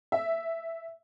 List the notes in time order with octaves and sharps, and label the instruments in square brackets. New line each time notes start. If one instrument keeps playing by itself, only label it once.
[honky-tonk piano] E5